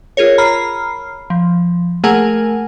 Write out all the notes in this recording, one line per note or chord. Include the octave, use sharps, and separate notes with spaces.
F4 G#4 A#4 C#5
A#5 B5 F6 C7
F3
A3 A#3 G#4 A#4 F#5 G#5